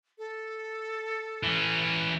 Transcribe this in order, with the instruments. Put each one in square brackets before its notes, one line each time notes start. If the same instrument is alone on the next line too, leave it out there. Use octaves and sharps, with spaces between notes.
[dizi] A4
[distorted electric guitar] E3 C#4